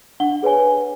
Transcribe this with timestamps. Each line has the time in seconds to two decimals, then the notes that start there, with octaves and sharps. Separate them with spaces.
0.20 D4 F#5 G7
0.43 G#4 B4 C#5 G#5